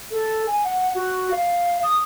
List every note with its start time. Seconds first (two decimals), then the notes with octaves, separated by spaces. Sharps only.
0.11 A4
0.47 G#5
0.64 F#5
0.95 F#4
1.31 F5
1.83 D#6